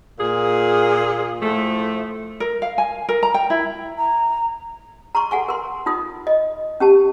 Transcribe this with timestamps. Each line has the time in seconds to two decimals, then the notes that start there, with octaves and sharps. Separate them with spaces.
0.20 A#2 G#4
1.42 A2 F3 A3
2.40 A#4
2.62 F5
2.78 G#5
3.09 A#4
3.23 A#5
3.34 G5
3.50 E4
3.98 A#5
5.15 A#5 C6 C#6
5.31 A4 F#5 G#5 C#6
5.49 A#4 C6
5.86 D#4 F4 D#6
6.27 D#5
6.80 C#4 G4 A5